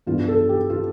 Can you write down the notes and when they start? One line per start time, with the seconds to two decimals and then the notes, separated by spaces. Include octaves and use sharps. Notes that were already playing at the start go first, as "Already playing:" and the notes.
0.07 G2 F3 B3 E4 F4
0.28 A4
0.49 G4
0.70 F4